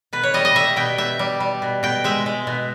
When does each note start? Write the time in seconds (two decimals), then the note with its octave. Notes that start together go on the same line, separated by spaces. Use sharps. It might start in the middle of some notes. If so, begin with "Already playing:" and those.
0.13 B2 B4
0.23 C#5
0.34 G3 D#5
0.45 D#5
0.55 G3 E5
0.76 B2 G5
0.98 B2 E5
1.19 G3
1.40 G3
1.62 B2
1.83 B2 G5
2.04 G#3 E5
2.26 G#3
2.47 B2